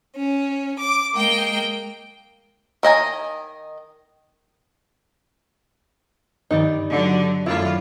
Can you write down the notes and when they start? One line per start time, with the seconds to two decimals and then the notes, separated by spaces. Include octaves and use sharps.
0.15 C#4
0.78 D6
1.14 G#3 A#3 G5
2.83 D#3 D#5 G#5 A#5
6.51 G2 D#3 G3 D#4 D5
6.90 D3 F#3
7.46 F#2 A3 E4 F4 D5 B5